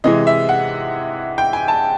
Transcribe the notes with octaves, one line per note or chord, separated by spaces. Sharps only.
C3 E3 G#3 D#5
E5
F#5
G5
G#5
A5